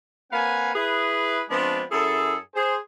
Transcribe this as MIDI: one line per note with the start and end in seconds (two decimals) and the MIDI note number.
0.31 0.69 58
0.31 0.69 60
0.31 0.69 71
0.31 0.69 77
0.31 0.69 78
0.31 0.69 80
0.75 1.42 64
0.75 1.42 68
0.75 1.42 71
1.49 1.82 53
1.49 1.82 56
1.49 1.82 59
1.49 1.82 60
1.49 1.82 62
1.90 2.35 42
1.90 2.35 64
1.90 2.35 68
1.90 2.35 69
2.54 2.75 68
2.54 2.75 72